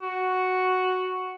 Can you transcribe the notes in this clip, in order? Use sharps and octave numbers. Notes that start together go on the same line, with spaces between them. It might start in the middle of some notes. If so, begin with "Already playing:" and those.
F#4